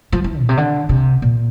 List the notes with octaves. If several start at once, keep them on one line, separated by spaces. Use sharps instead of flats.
F3
E3
A#2
C3
D3
C3
A#2